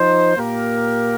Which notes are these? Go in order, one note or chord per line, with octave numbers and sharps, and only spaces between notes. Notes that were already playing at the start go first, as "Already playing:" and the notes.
Already playing: F3 D#4 C5
A#2 A#3 G4 A#4